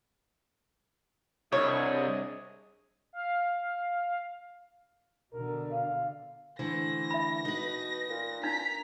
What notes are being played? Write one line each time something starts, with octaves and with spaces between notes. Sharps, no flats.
C2 D4 G#4 C#5 D#5
F5
B2 D3 A#4
F5
D3 E3 A3 C5 A#6
E5 B5
B2 D#4 B4
A#2
D4 D#4 A#5 B6